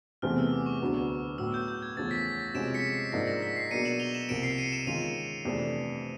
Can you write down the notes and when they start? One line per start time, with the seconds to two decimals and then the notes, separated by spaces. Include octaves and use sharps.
0.22 E2 C3 E3 A3 C4 F6
0.38 E6
0.52 D6
0.66 C#6
0.81 D2 D3 F#3 B3
1.38 A2 F#3 B3 E6
1.54 G6
1.68 G6
1.82 G#6
1.97 E2 C#3 F3 A3 C#4 A6
2.11 B6
2.26 A6
2.40 A#6
2.54 C3 F3 G#3 C#4 F#4 D7 E7
2.74 B6 C#7
2.94 C7
3.12 G#2 F3 A#3 D4 A#6
3.27 A#6
3.42 B6
3.56 C7
3.71 B2 F#3 A#3 D4 C#7 D#7
3.85 E7 F#7
4.00 F7 G7
4.14 E7 F#7
4.29 C2 C3 F3 A#3 D7 E7
4.43 C7 D7
4.58 C#7 D#7
4.72 D7 E7
4.87 D#3 G#3 C#4 F4 D#7 F7
5.45 F2 C3 E3 A3 D4